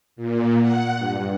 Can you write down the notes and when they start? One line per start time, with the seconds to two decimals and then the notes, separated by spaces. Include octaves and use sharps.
0.16 A#2
0.61 F#5
0.98 G2